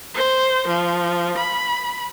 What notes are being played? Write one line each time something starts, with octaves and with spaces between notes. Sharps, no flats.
C5
F3
B5